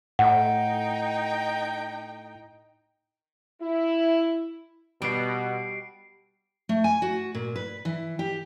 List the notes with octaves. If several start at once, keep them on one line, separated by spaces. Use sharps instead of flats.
A2 D#4 F#5 G5
E4
B2 G3 C7 D7
A3
G#5
F#4
A#2
B4
E3
G4